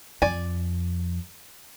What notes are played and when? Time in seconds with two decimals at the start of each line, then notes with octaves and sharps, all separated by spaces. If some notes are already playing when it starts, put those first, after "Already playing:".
0.22 F2 D5 G#5